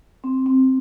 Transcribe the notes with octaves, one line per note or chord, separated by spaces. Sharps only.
C4
C4